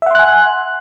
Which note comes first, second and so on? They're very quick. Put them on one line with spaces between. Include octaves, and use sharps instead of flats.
E5 F#5 C6 F#6 G#5